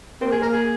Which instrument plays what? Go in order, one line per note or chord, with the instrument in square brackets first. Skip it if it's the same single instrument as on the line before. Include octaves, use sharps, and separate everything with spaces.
[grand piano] A#3 [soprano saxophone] C4
[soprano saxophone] G#4
[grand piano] A#3 [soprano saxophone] A#4
[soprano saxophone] G#4